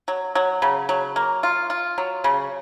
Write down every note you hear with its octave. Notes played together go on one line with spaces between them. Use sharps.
F#3
F#3
C#3
F#3
A#3
F4
F4
F#3
C#3